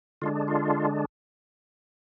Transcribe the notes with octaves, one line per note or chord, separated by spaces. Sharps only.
D3 G#3 D4 F4
F4